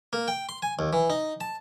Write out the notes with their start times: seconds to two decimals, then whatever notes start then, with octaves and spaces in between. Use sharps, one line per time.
0.13 A#3
0.28 G5
0.49 C6
0.62 G#5
0.79 D#2
0.93 E3
1.10 D#4
1.41 A5